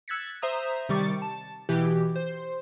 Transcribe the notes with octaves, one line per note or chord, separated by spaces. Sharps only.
E6 F#6 G#6 A6 B6 C#7
C5 E5 A#5 D#6
C3 D#3 G3 C#6 D6 A6
A5
B2 E3 G4
C5